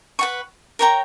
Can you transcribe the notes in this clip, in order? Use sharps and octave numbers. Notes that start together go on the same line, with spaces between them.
B4 F#5 C#6
A#4 C#5 G5 A#5